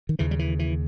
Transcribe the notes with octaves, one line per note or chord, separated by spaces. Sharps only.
D#3
D#2 C#3 E3
G3
E3
E3